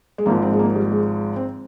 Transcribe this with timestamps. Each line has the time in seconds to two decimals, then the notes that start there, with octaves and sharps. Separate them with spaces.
0.18 G#3
0.26 G#1 G#2 F3 A#3
0.42 C4
0.53 G#3
0.59 A#3
0.75 G3
0.92 G#3
1.36 C4